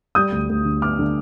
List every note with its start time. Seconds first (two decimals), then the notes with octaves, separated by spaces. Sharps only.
0.15 G3 D#6 G6
0.32 D2
0.49 D2
0.65 D3
0.82 B3 D6 F6
0.99 D3